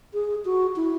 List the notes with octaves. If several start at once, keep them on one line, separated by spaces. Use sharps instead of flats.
G#4
F#4
E4